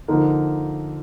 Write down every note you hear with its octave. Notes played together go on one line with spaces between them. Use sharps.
D3 F3 A#3 D#4 A#4